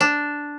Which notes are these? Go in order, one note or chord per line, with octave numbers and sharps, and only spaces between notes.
D4